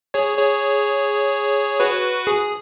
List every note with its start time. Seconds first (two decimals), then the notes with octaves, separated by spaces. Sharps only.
0.14 G#4 C#5
0.38 G#4 C#5
1.80 F#4 B4
2.27 G#4